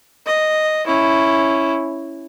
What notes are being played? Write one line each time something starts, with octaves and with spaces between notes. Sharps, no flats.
D#5
C#4 E4